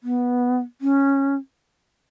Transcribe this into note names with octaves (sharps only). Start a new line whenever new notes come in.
B3
C#4